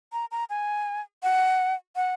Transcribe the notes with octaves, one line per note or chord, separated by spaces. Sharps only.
A#5
A#5
G#5
F#5
F#5